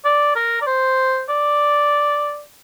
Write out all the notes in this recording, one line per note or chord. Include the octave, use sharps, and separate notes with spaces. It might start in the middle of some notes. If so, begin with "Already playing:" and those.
D5
A#4
D5
C5
D5